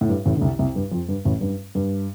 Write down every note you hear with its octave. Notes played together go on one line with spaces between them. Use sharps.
A2
G2
A1 A2
D3
C2 C3
C2 C3
G2
F2
G2
A1 A2
G2
G2